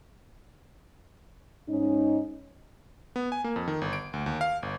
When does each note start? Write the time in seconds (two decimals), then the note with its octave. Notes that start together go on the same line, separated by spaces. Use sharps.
1.68 G#2 C#4 D#4
3.16 B3
3.32 G#5
3.44 A#3
3.56 F2
3.68 D#3
3.81 G1
3.93 D7
4.13 D2
4.26 D#2
4.41 F5
4.63 G1